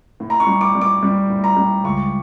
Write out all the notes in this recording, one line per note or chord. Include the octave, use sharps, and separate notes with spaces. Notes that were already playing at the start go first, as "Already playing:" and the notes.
A2
A#5
C#6
G3
D6
G3
D6
G3
A2
A#5
G3
C#2 C#6